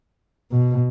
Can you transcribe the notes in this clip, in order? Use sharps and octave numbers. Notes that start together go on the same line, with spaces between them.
B2